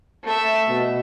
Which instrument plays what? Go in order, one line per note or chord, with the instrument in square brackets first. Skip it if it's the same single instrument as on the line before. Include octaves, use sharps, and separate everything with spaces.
[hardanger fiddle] A3 E5
[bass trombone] B2